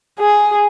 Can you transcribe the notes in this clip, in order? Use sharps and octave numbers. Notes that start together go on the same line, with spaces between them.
G#4